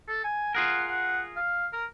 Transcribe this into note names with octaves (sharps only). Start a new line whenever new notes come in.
A4
G#5
F4 G#4 A#4 F#5
F#5
F5
A#4